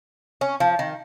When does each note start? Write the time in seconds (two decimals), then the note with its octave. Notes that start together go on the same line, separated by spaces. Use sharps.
0.41 C#4
0.60 F3
0.79 D#3